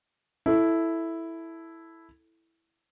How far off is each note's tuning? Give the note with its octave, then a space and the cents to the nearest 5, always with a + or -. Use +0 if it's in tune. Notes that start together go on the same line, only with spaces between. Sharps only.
E4 +0 A4 +0